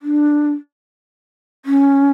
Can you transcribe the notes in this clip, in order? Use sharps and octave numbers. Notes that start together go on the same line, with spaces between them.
D4
C#4